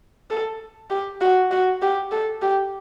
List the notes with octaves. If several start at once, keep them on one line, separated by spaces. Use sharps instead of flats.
A4
G4
F#4
F#4
G4
A4
G4